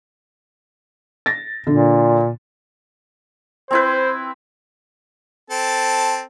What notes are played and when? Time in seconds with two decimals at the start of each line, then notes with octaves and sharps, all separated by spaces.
1.26 A6 A#6
1.67 A#2 D3
3.71 C4 E4 B4 C5
5.50 C4 A4 A5